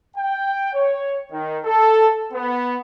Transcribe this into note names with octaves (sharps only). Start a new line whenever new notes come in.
G5
C#5
D#3
A4
B3